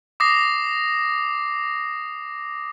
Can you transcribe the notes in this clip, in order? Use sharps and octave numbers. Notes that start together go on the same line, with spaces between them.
D6 D#6 A#6 C7